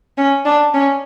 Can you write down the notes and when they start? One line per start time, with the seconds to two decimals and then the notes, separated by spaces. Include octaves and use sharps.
0.18 C#4
0.45 D4
0.74 C#4